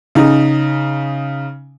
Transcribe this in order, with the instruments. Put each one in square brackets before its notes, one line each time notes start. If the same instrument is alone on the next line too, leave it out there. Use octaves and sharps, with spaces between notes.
[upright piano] C#3 D#4